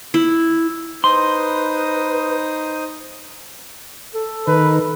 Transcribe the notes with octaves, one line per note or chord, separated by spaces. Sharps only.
E4
D#4 B4 C5 C6 D#6
A4
D#3 B4